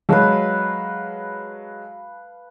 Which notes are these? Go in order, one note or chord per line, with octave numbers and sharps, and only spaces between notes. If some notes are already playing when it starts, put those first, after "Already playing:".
F#3 G#3 B4 F5 A5